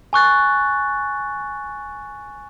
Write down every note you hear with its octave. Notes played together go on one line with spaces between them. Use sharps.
G#5 C#6 F#6 A6